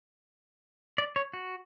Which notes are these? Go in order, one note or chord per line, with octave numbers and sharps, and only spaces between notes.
D5
C#5
F#4